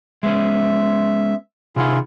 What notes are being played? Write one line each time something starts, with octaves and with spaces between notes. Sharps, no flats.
G#3 B3 C#4 E5
C3 D#3 E4 F4 G#4 F#5